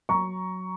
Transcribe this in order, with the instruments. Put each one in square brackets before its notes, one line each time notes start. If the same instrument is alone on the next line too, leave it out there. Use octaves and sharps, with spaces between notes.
[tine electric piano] F#3 [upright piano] A#5 C#6